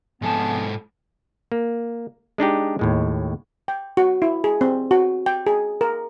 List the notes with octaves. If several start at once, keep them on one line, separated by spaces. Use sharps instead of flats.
G#2 C3 F3 B3 A4 G#5 A5
A#3
G#3 D4 D#4 G4
D#2 A2 G#3
G5
F#4
E4
G#4
C4
F#4
G5
G#4
A#4